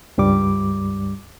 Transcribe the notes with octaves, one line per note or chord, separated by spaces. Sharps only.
C#2 G2 G3 D6